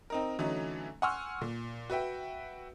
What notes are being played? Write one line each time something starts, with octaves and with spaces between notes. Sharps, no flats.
C4 D#4 A#4
D3 E3 F#3 A3 C#4 D#4
F#5 G#5 C6 C#6 E6 F6
A#2
F#4 B4 E5 G5